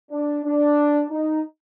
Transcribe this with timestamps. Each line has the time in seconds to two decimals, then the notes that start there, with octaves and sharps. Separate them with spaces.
0.11 D4
0.44 D4
1.11 D#4